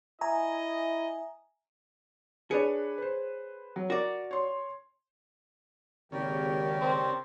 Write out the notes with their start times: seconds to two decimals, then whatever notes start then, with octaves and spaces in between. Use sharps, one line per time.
0.21 E4 D#5 E5 G#5 A#5
2.51 D4 G#4 B4 C#5 C#7
2.98 B4 C5
3.76 F#3
3.90 F#4 A#4 D5
4.31 C#5 C6
6.12 G#1 D#2 C#3 G4 A#4 D5
6.81 C4